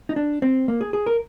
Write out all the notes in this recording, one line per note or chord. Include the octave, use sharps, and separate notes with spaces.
D#4
D4
C4
A#3
G#4
G#4
A#4